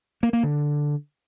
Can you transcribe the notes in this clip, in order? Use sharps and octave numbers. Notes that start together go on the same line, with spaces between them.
A#3
A#3
D3